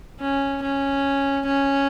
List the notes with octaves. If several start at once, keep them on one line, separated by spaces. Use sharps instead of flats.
C#4
C#4
C#4